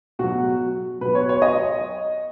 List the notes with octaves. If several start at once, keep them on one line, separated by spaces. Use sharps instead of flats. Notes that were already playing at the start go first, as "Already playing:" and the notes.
B2 F#3 F#4
B2 F#3 B4
C#5
C#5
D#5